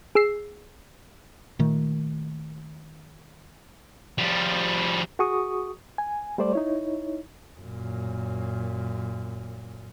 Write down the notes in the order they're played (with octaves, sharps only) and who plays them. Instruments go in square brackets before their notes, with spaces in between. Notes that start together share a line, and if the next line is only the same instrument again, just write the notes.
[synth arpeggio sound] G#4 E6 C7
[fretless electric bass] A#2 D#3 A3
[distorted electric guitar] F3 G3
[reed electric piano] F#4 G#4 C#6 D#6
G#5
G3 A3 C5 D5
D#4 E4 C#5
[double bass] F#2 A#2